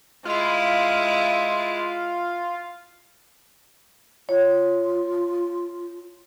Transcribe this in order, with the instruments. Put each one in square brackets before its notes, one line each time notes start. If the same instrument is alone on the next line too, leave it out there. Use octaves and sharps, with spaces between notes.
[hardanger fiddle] G#3 E4 [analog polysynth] F4 F5
[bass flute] F4 [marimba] C#5